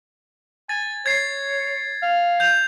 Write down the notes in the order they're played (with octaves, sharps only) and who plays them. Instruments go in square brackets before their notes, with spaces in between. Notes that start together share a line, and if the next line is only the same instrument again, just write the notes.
[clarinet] G#5 [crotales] A6
[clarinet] C#5 [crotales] G#6 A6 C7
[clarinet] F5
[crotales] G6 F7